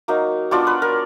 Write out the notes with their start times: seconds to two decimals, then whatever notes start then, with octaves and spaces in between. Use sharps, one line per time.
0.08 F#3 A#3 D#4
0.51 F#3 B3 D4 F4 D5
0.67 B4
0.82 A#4